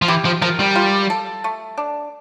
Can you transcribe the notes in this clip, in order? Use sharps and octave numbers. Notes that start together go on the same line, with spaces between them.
F3
E3 G4
F3
F3 A#4
G3
F4
A4
A3
D4